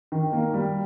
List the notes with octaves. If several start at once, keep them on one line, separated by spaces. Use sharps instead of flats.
D#3
A#3
G3